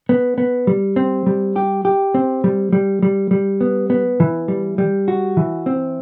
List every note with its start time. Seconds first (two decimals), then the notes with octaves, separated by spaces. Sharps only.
0.09 B3
0.38 B3
0.67 G3
0.96 C4
1.26 G3
1.56 G4
1.85 G4
2.14 C4
2.44 G3
2.73 G3
3.03 G3
3.31 G3
3.61 B3
3.90 B3
4.20 E3
4.48 G3
4.78 G3
5.08 F#4
5.37 E3
5.66 C4